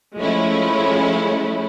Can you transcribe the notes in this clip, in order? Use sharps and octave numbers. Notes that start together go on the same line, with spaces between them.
F3 G#3 A3 C#4 E4